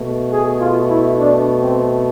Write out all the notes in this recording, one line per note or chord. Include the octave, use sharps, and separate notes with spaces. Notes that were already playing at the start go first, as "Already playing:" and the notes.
Already playing: B2 A3
G#4
F4
E4
D4
C4